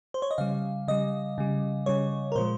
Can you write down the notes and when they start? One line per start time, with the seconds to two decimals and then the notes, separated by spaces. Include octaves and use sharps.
0.14 C5
0.22 C#5
0.31 D#5
0.38 C#3 G3 F5
0.88 C#3 G3 D#5
1.38 C#3 G3
1.86 C#3 G3 C#5
2.32 A#4
2.35 A#2 F3 G#3 C5